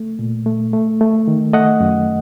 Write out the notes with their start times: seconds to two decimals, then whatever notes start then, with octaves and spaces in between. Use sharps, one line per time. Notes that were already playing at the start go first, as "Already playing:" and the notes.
Already playing: A3
0.19 A#2
0.46 A3
0.73 A3
1.01 A3
1.28 D#3
1.53 A3 D#5 F#5
1.80 F#2